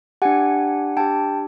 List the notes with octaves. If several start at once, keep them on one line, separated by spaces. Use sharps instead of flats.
D4 G4 F#5 G#5
D4 G4 G5 A5